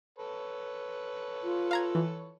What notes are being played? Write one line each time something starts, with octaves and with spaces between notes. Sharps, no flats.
A4 B4 C#5
F4
F5 A#5 G#6
E3